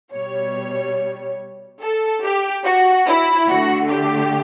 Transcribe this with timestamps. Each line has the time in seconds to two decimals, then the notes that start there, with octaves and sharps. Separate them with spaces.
0.13 B2 G3 C#5
1.81 A4
2.23 G4
2.65 F#4
3.07 E4
3.49 D3 A3 F#4
3.91 G4